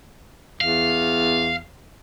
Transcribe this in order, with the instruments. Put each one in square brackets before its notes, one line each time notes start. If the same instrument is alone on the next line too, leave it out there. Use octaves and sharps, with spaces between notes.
[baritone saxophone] E2 [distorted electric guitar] F5